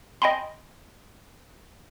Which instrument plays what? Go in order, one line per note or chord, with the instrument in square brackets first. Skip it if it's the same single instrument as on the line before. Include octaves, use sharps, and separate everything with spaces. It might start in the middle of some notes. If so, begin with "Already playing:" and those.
[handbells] D#5 G5 G#5 B5 C6